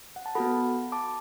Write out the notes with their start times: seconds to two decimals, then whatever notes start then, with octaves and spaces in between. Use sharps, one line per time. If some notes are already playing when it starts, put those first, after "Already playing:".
0.16 F#5
0.26 A5
0.35 B3 F#4 A4 F#5 B5
0.92 A5 D6